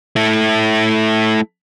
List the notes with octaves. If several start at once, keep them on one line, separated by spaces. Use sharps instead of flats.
A3 E4